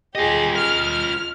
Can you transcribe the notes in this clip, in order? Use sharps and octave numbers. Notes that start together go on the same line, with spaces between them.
F4 G4 G#4 D#5
F6